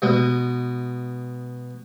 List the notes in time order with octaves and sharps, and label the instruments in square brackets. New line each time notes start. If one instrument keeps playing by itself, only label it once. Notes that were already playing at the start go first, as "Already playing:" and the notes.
[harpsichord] B2 G#3